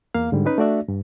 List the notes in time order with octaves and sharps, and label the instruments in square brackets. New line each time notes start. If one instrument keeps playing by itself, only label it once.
[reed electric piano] E2 A#3 F5
G#2 D3 G3
C#4 D#4 B4
A3 D4 F#4 D5 E5
G2